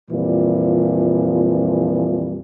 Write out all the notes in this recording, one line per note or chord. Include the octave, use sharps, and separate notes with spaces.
F2 A#2 E3 F3 G3